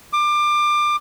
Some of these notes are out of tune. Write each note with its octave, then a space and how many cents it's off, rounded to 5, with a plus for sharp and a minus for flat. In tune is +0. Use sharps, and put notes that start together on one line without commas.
D6 +25